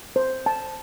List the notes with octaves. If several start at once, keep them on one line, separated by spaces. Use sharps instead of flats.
C5
A5